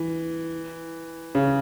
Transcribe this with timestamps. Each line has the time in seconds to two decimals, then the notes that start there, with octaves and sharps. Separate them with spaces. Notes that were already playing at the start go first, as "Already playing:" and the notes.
Already playing: E3
1.35 C#3